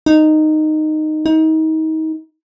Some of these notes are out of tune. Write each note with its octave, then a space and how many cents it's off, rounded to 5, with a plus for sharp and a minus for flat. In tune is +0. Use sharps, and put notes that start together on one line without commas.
D#4 -10
D#4 +30